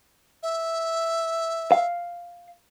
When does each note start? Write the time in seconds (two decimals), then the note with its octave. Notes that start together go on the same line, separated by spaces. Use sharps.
0.43 E5
1.72 F5